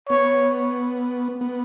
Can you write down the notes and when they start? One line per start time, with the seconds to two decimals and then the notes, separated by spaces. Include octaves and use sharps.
0.09 B3 C#5
1.41 B3